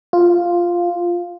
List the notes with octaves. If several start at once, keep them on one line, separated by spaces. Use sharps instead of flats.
F4